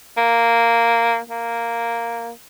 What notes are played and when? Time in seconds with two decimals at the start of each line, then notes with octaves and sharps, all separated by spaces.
0.18 A#3
1.30 A#3